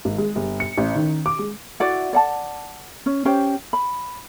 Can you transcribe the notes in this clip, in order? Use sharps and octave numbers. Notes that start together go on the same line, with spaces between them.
G#1
G#3
G1
C#7
A1
D#3
D6
G#3
E4 F#4 D5 F#5
D5 F#5 A5
C#4
C#4 G4 C5 G5
B5